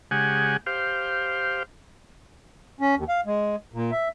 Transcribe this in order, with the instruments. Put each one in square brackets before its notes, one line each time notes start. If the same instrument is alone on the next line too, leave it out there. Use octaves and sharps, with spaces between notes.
[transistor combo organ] C#3 G#3 G4 F#5 G#5
G4 C5 F5
[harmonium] C#4
D#2
F5
G#3
A#2
E5